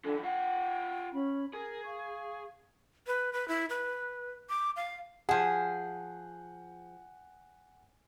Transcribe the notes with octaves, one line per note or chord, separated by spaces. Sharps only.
D3 E3 D4 F4 A4
F4 F#5 G5
C#4 B5
G#4 A#4
F5 C#6
B4
B4
E4
B4
D6
F5
F3 G#4 F#5 G#5